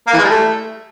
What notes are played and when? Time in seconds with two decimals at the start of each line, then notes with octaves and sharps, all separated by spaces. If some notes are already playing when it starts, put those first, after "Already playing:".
0.07 A#3
0.13 E3
0.18 G#3
0.24 G3
0.29 A3